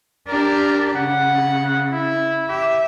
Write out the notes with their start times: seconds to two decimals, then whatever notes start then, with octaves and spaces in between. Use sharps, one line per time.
0.28 D4 G4 A#4
0.96 C#3 F#5
1.92 E4
2.49 G4 E5